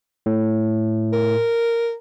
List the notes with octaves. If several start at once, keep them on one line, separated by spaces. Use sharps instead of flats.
A2
A#4